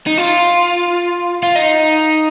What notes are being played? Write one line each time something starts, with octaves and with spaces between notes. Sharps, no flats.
D#4
F4
F4
D#4